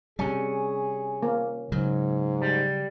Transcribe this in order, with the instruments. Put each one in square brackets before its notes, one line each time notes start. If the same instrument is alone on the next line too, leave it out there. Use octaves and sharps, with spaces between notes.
[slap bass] C3 G3 [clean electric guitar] C#4 [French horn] G#4
[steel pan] A#3
[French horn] G#2 [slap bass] C#3 F#3
[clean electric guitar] G3